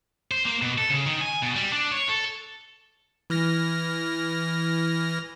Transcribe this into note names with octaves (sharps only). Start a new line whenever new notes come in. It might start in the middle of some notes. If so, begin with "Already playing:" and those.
C5
A#3
B2
A4
C#3
D#3
G#5
B2
G3
D4
C#5
A4
E3 F6 A#6